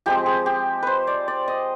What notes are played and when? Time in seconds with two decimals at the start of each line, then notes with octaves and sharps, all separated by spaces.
0.06 F3 G#3 C4 G4
0.26 G#4
0.46 G4
0.83 B4 C5
1.07 D5
1.28 D5
1.48 D#5